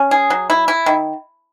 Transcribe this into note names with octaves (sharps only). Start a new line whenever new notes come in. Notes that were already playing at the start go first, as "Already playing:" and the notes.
Already playing: C#4
G#4
F#3
E4
E4
D#3